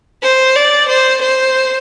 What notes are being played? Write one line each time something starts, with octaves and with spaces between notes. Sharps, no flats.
C5
D5
C5
C5